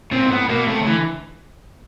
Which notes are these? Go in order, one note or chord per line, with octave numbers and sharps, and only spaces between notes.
A#2 C4
G#2
A2 B3
B2 A#3
C3 A3
C#3
D3 E3